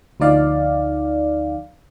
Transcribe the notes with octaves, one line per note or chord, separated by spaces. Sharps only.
D2 F3 D#4 D5 F5